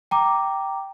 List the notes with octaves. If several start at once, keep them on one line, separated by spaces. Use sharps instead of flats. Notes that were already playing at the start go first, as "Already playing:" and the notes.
G5 A#5 D6